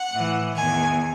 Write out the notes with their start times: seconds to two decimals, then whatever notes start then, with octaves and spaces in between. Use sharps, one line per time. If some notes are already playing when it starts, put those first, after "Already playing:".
Already playing: F#5
0.11 A2 E3
0.55 E2 D#3 G#5